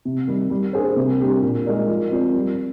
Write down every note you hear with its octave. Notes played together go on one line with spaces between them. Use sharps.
C3
D#3 G3
G3
A#3 D4 G#4 C5
C3
G3 D4 G4 A#4
A#2
G#3 D#4 A#4 D5
F3
C4 F4 A#4 D5
G3